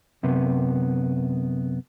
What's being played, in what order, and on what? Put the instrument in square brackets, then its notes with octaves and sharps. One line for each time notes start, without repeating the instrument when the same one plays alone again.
[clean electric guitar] F#2 C3 B3